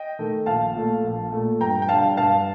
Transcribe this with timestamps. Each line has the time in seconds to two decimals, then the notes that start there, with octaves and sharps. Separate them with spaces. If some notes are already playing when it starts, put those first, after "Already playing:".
Already playing: D#5 G5
0.19 D#3 A3
0.46 A#1 F5 A5
0.75 A#2 A3
1.04 A#1
1.32 A#2 A3
1.60 G2 G5 A#5
1.82 G5
1.89 D3 G3 F5 A5
2.17 G2 F5 A5